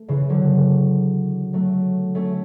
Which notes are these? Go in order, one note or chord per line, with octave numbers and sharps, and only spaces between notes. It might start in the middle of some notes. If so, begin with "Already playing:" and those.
Already playing: A3
C#3 E3
D3 F#3
F#3 A3
A3 C#4